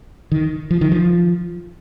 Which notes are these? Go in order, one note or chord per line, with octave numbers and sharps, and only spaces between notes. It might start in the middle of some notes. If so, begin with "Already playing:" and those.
D#3
F3
D#3
F3